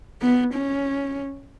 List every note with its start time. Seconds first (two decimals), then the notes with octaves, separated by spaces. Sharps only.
0.22 B3
0.54 C#4